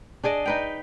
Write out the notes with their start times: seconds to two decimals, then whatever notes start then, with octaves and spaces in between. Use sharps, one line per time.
0.23 D4 G#4 D5 D#5
0.46 D#4 B4 G5